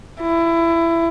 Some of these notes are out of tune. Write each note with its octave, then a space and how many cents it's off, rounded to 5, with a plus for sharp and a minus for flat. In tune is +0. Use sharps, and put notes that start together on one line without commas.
E4 +20